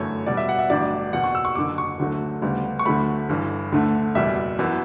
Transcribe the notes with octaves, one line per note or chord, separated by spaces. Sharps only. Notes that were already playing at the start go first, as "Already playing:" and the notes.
Already playing: G1 F#2 E3 A3 C#5
E2 B2 G3 B3 D5
E5
F#5
E5
A1 G2 D3 F#3 B3 D5
F#1 E2 B2 F#5
C#6
E6
C#6
F#1 F#2 D3 D6
C#6
D2 D3 F#3 A3
D2 C#3 G3 B3
C#6
D2 D3 F#3 A3 B5
G1 G2 E3
D2 D3 A3
F#1 E2 B2 G3 E5
F#2 E3 B3